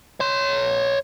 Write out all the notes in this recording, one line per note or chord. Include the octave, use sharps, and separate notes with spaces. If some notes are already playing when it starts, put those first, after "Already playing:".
C#5 C6